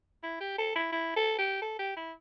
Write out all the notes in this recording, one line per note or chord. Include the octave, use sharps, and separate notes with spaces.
E4
G4
A4
E4
E4
A4
G4
A4
G4
E4